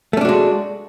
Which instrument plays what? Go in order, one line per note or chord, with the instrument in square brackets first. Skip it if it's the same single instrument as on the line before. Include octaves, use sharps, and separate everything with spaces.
[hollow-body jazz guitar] A3
C#4
D4
F#4
G#3